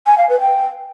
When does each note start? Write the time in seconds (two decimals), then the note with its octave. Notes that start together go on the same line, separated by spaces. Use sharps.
0.07 G#5
0.18 F5
0.29 B4
0.41 G5